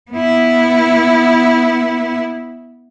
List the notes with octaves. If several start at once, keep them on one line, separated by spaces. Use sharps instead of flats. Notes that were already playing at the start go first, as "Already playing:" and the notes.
B3 E4